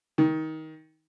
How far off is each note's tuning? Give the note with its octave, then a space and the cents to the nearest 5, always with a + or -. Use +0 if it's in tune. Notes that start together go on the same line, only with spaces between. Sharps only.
D#3 +20